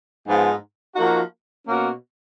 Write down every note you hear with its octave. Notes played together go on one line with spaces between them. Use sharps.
G#2 F3 B3
F3 A#3 D#4 F#4
B2 A#3 C#4 F#4